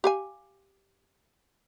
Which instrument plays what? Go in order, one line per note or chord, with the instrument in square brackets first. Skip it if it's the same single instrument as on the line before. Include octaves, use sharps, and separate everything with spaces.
[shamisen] G4 F5 G#5